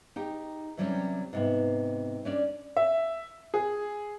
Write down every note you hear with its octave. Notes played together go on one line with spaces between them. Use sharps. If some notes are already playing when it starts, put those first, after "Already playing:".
D#4 G4 G5
C3 E3 F#3 G3 C4 C#4
G#2 C3 B3
C#4 D4 D5
E5
G#4